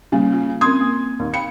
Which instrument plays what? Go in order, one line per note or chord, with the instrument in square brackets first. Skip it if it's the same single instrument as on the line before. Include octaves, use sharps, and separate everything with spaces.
[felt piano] C#3 [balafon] G3 A#3
[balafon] F4
[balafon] C4 C#4 A#4 [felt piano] C6 D#6 G#6
[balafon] A#3
[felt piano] D#2
[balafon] F5 G5 B5 [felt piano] C#7